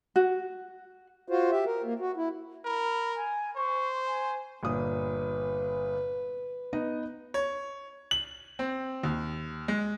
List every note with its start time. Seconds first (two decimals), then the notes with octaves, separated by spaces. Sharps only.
0.16 F#4
1.28 F4 F#4 C5
1.51 G4 E5
1.66 A#4
1.84 A#3
2.00 F#4
2.17 E4
2.65 A#4 B5
3.16 G#5
3.56 C5 C#6
4.07 G#5
4.63 G1 A#2 B4 D#6
6.73 B3 D#4 D#5
7.34 C#5
8.11 F#7
8.59 C4
9.03 D#2
9.68 G#3